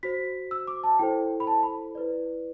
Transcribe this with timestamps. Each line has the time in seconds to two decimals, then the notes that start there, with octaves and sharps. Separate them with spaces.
0.03 F#4 C5 B6
0.51 E6
0.67 D6
0.84 A5
0.99 E4 A4 C5 G5
1.40 B5
1.47 A5
1.63 B5
1.95 E4 B4 D5